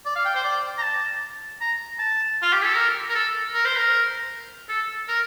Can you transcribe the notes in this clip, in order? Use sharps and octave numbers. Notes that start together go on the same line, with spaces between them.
D5
F5
G5
C5
D5
A#5
A5
A#5
A5
F4
G4
A4
A#4
A#4
A4
A#4
C5
A#4
A4
A#4